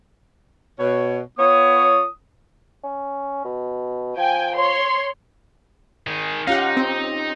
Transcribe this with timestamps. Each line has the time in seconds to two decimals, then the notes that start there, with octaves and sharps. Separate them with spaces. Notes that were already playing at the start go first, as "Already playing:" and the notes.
0.80 B2 C#5
1.39 B3 F4 C#5 D#6
2.84 C#4
3.45 B2
4.17 F3 G5 G#5
4.56 C#5 C6
6.07 D#3 G#4
6.47 C#4 D#4 F4 G4 F5 F#5
6.77 C4